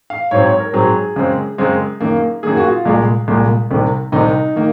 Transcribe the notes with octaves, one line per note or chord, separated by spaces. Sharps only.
F5
G#2 F#3 C4 C#5
C#5
A#4
G#2 F#3 C4 G#4
F#2 C#3 G#3 C4
F#2 C#3 G#3 C4
F#2 D#3 A#3
F#2 D#3 A#3 G#4
F#4
F4
C2 A#2 G#3
C2 A#2 G#3
C2 C3 D#3
C2 C3 D#3 D#4
D#3 A#3